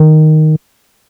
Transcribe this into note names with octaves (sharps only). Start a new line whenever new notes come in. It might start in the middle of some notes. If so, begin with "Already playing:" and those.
Already playing: D#3